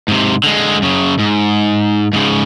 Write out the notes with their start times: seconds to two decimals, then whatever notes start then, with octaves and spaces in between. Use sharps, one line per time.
0.08 G#2 C3
0.44 D3 G#3
0.82 F#2 C#3
1.19 G#2
2.13 G#2 C#3